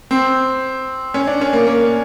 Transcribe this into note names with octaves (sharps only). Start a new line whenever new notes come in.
C4
C#4
D4
C#4
A#3
A#3